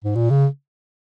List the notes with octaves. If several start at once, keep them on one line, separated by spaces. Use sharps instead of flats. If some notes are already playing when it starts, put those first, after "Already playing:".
G#2
A#2
C#3